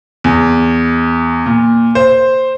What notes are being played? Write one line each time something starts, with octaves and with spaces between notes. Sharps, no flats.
E2
A#2
C5